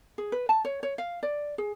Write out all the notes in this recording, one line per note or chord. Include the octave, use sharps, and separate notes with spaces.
G#4
B4
A5
C#5
C#5
F5
D5
G#4